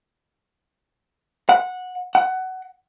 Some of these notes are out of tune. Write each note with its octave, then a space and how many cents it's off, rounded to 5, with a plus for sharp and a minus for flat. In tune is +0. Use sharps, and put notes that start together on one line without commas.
F#5 -15
F#5 +15